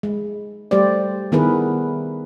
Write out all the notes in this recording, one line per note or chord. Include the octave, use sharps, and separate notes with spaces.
G#3
G3 A3 G4 C5 D5
D#3 B3 E4 G#4 A#4 B4